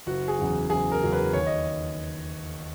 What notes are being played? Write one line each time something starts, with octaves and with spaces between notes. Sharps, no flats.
F#1 F#4
G#4
E2 C#3 F#3
F#1 G#4
A#4
E2 C#3 F#3
B4
D#2 C#5
D#5